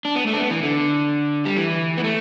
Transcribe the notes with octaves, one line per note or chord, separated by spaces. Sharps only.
D4
B3
A3
D4
B3
E3
D3
G3
E3
B3
A3